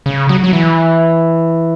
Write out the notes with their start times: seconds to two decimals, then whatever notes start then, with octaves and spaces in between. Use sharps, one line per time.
0.06 C#3
0.29 F#3
0.44 F#3
0.53 E3